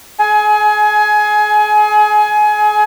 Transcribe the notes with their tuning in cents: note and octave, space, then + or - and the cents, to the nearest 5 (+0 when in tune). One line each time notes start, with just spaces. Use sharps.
G#4 +30 G#5 +20